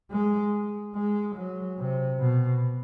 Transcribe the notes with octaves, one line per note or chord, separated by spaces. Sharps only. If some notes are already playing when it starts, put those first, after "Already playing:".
G#3
G#3
F#3
C3
B2